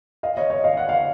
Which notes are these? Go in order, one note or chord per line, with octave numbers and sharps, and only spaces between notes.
D#5 F5
C#5 D#5
C#5 D#5
D#5 F5
F#5
F5